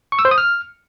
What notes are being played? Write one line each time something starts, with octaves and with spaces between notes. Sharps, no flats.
C#6
E6
C5
D#6
F6